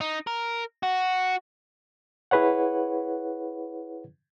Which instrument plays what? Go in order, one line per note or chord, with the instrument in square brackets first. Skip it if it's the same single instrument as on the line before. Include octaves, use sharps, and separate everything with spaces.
[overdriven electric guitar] D#4
A#4
F#4
[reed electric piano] E4 G#4 B4 C#5 F#5